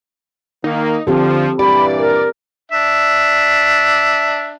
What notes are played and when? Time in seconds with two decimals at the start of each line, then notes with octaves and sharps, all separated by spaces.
0.64 D#3 A#3 D#4
1.07 D3 F3 C4 G4 A4
1.59 G2 A#2 E3 G4 D5 B5
1.98 A#4
2.72 D4 E5